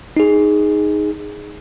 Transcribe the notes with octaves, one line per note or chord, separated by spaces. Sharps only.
D#4 G#4